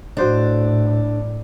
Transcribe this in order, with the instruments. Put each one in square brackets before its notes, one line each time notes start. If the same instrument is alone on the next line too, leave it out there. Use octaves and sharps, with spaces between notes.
[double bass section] A2 [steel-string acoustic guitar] D4 [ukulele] F#4 C5 D#5